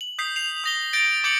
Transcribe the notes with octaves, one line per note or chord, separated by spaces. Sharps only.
F#7
D#6 G6 B6 C7
C7 F7
D#6 A#6 G7
G6 A6 A#6 D7 G7
D6 G6 A6 C#7 F#7